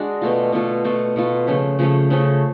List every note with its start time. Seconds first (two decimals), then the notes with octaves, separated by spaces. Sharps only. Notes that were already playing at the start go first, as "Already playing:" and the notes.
Already playing: G#3 D4 F#4
0.22 B2 A3 F4
0.52 B2 A3 F4
0.84 B2 A3 F4
1.16 B2 A3 F4
1.47 C#3 F3 A3 C#4
1.79 C#3 F3 A3 C#4
2.10 C#3 F3 A3 C#4